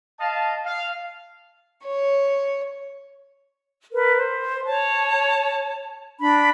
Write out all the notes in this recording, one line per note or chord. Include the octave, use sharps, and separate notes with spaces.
D#5 F5 A5
F5
C#5
A#4 B4
C5
C#5 A5
D4 B5